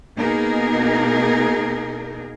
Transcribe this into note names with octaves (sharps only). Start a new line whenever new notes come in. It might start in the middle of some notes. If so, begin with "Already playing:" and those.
B2 A#3 D#4 G#4 A#4